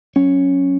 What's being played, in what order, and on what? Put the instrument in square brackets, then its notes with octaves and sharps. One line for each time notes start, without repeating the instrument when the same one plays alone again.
[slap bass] F#3 C#4